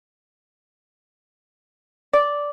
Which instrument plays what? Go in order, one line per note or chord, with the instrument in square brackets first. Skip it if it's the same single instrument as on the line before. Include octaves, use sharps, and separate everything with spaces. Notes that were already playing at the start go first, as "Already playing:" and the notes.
[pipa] D5